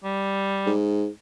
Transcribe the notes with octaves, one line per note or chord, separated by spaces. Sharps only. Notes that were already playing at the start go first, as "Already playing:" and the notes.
G3
G#2